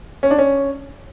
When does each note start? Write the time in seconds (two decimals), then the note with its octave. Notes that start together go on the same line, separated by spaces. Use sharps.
0.23 C#4
0.31 D4
0.38 C#4